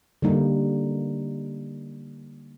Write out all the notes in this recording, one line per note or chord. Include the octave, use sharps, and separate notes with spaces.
D3 G3 A#3 D#4